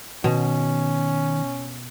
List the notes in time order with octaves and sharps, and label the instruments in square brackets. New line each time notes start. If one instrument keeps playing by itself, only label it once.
[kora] B2 [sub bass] D#3 [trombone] C#4